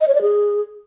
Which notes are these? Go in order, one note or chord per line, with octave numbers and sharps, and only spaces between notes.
D#5
C#5
D5
G#4